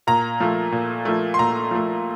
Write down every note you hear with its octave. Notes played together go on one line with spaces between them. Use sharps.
A#2 A#5
F3 A3
A#2
F3 A3
C6
A#2 A#5
F3 A3